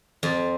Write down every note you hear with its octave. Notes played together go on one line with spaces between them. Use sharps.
F2